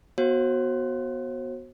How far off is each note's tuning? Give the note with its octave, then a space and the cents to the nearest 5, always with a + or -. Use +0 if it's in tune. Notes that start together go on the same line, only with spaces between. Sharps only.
B3 -10 F#4 +0 C5 +40